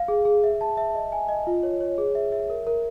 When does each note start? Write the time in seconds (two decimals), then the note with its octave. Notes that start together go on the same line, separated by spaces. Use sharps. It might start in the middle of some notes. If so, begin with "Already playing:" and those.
Already playing: F5
0.08 G#4
0.25 G#4
0.44 E5
0.61 A5
0.77 E5
0.95 D#5
1.12 G#5
1.29 D#5
1.47 F4
1.63 C#5
1.81 C#5
1.98 G#4
2.15 E5
2.32 E5
2.50 A#4
2.67 A#4